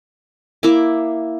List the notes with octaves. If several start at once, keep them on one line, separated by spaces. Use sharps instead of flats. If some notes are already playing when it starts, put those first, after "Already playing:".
A#3 E4 E5 D6